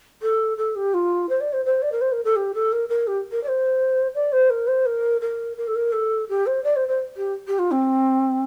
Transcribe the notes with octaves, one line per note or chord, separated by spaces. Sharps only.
A4
A4
G4
F4
C5
D5
C5
C5
D5
A#4
C5
A#4
A4
G4
A4
A#4
A#4
G4
A#4
D5
C5
D5
C5
A#4
C5
A#4
A#4
A#4
A4
A#4
A4
G4
C5
D5
C5
C5
G4
G4
F4
C4